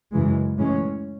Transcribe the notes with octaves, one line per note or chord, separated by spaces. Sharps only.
F#2 C#3 E3 G#3
A2 E3 G#3 C#4